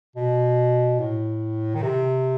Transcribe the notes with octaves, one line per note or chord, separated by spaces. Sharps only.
B2
A2
D#3
C3